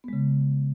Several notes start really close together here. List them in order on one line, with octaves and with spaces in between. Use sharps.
B3 G#3 C#3